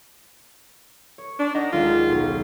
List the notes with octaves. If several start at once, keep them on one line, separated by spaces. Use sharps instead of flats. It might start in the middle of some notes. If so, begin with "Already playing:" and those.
C#5
D4
D#4 D#5 F#5 A#5
D#2 G#3 F4 B6
B1 C#4